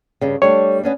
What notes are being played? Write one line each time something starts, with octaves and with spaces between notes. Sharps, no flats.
G2 C#3
G3 A3 D4 C#5
B3 C#4 D4